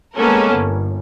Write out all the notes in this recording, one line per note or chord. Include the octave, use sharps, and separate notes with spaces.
G#3 A#3 B3 C#4 A4 A#4
G1